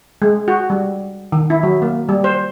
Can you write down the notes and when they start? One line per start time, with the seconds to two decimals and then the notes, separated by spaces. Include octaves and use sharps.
0.22 G#3
0.48 F#4
0.70 G3
1.32 D#3
1.50 E4
1.63 F#3
1.82 A#3
2.09 G3
2.24 C5